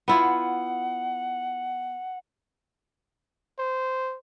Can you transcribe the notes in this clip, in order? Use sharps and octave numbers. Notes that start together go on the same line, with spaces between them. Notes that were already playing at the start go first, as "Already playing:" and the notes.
B3 E4 F4 F#5
C5